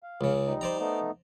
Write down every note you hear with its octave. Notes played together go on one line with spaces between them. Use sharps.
F5
C#2 C#3
G3 D#4
C5 D5 A#5
A3 B3 D#4